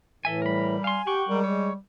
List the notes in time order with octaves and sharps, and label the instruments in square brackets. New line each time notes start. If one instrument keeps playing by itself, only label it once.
[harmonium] A2 E3 [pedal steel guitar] A4 E5 G#5
[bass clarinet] G3 [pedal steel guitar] A#4 B5
[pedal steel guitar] F5 C6 [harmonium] G#5
[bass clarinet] G4 [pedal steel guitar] F#5 G5 C#6
[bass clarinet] G3 [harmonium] G#3 A#4
[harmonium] G#3 [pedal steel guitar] C#5